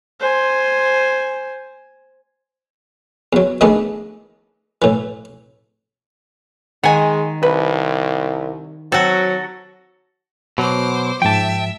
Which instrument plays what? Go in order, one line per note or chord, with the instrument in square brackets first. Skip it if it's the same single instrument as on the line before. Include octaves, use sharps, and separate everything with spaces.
[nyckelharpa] C5 G#5
[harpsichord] E2 F#3
D#3 E3 G#3 A3 B3 D4
A2 E3
[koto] D#3 [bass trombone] G#3 [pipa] F#5 G#5
[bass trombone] C2 [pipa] B4
[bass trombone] F#3 [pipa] C4 [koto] F#4 A4
[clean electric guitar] B2 F#3 [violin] C5 D6
[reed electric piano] G#2 F3 [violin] E5 [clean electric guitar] G5 A5